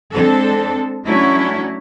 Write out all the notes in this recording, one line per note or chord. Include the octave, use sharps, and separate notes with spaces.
G#3 C4 D4 A4
F#3 A3 C#4 D4 E4